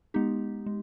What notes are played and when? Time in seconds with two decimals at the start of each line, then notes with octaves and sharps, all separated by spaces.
0.14 G#3 B3 D#4 G4
0.66 G#3